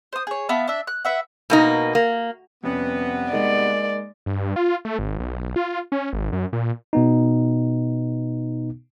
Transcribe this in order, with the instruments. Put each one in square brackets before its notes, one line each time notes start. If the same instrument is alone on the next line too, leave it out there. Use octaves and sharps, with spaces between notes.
[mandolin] C5 D#6
G#4 C#5
B3 E5 F5 A5
D4 E5
F#6
B4 E5 F#5
[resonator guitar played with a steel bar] B2 A#3 D#4
A#3
[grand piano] F2 C#4 [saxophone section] C3 G3 B3
[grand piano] G#3 A#3 D#4 [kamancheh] D5
[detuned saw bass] G2
F4
A3
G#1
B1
F4
C#4
G#1
F#2
A#2
[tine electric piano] B2 B3 D#4